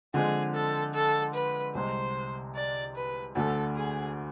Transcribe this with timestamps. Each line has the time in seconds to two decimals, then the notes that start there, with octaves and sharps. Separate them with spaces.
0.14 D3 F3 G#3 C4 G#4
0.55 A4
0.94 A4
1.34 B4
1.75 C2 C3 G#3 C5
2.56 D5
2.96 B4
3.35 D2 D3 A3 A4
3.76 G#4